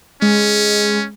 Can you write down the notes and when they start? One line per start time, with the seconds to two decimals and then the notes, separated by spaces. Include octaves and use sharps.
0.22 G#3 C#4